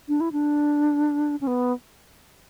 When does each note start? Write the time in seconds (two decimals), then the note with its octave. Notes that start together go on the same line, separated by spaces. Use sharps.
0.08 D4
0.21 E4
0.32 D4
1.41 C#4
1.47 B3